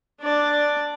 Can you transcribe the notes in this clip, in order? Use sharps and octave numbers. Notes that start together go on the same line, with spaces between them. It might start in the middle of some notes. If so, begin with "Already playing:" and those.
D4 D5